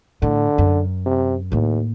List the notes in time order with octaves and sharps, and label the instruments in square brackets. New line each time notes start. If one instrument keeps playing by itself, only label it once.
[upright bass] A2 [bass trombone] D3
[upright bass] F#2
[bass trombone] C3
[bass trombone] D#2 [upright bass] A2 A#3